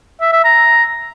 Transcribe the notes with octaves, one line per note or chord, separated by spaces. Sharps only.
E5
E5
A#5